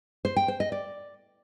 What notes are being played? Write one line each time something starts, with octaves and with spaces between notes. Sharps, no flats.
C5
G5
C5
D#5
D5